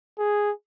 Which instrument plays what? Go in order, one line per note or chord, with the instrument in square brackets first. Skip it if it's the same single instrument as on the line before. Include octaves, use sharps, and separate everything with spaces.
[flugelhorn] G#4